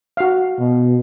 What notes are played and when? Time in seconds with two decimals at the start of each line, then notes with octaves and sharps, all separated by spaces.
0.17 F#4 F5
0.60 B2